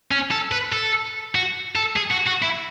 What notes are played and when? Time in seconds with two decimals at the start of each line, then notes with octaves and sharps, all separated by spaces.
0.12 C#4
0.31 A4
0.52 B4
0.72 A4
1.35 F#4
1.76 A4
1.96 G#4
2.11 F#4
2.27 F#4
2.43 E4